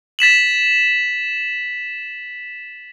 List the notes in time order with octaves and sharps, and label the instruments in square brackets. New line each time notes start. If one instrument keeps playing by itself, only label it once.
[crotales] A6 B6 E7 F#7